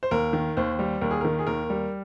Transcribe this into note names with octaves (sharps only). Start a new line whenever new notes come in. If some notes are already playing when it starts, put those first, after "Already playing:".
C5
D#2 A#4
D#3
D#2 C5
G3
D#2 A#4
G#4
D#3 A#4
G#4
D#2 A#4
G3